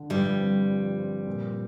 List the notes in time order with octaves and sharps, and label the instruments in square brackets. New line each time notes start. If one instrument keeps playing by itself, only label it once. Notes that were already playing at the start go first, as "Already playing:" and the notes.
Already playing: [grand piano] D3
[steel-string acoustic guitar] G2 G3 [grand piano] F3
[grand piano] C4
F3
C4
A#2